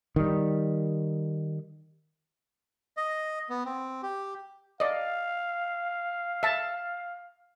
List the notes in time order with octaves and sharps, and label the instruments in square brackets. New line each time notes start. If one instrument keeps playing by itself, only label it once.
[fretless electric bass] D#3 G3
[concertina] D#5
B3
C4
G4
[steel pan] D5 D#5 [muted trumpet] F5
[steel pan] E5 A5